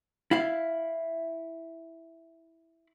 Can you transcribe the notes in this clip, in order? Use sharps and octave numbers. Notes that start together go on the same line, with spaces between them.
E4 F5